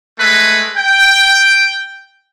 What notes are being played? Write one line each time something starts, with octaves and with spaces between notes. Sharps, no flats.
G#3 A3 B4
G5